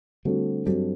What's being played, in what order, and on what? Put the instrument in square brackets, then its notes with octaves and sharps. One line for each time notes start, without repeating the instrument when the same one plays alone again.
[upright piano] D3 A3 C4 F#4 A4 [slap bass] G3
[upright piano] G2 F#3 C4 F#4 A4 [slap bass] G3